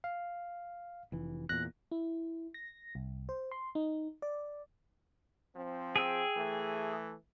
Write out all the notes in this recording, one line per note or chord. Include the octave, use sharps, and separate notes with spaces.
F5
F1 E3
E2 A#2 F#6 A#6
E4
A#6
C2
C5
C6
D#4
D5
F3 C4
G#4 G5 E6
E3 A3